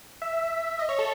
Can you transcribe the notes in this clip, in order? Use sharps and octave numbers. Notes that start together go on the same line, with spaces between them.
E5
D#5
C#5
A4